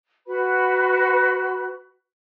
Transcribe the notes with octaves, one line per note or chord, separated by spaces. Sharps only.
F#4 B4 B5